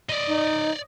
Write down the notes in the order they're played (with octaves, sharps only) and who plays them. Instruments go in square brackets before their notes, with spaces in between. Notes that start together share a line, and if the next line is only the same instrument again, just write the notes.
[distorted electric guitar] D5 D#5
[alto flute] D#4